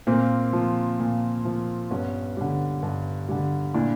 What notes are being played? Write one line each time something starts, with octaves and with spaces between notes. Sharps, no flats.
A#2 A#3 C4
F3
A#2
F3
G2 B3 C#4
D3 G3
G2
D3 G3
A#2 D4 E4